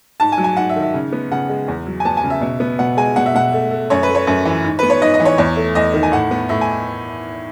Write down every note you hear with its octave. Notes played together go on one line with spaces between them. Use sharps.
G#2 A5
G#5
F#3
G#5
G#2 F#5
E5
D#3
E5
C#3
B3
C#3 F#5
G#3
E2
F#3
G#5
B3 A5
G#5
C#3
E5
B2
B3
B2 F#5
G#3 G#5
B2 F#5
E5
B2 F#5
A3
A3
F#2 C#5
B4
A3
C#5
F#2
E3
G#2
B3 B4
C#5
G#2 D#5
D#5
E3
C#5
E2 C#5
A3
E2 D#5
D#3
G#5
A2 F#5
B3
A2 E5
G#5